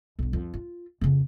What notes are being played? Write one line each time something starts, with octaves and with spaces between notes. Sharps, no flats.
B1 G2
F2
F4
F2 C#3